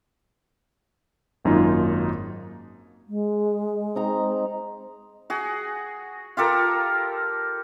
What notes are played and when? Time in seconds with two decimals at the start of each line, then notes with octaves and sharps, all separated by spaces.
1.45 G#1 F#2 A#3 D#4 F4 A#4
3.08 G#3
3.95 C4 D#4 A#5
5.30 F#4 G#4
6.37 F4 G4 A4 A#4